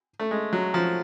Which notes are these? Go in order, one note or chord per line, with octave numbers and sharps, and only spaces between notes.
A3
G#3
F#3
F3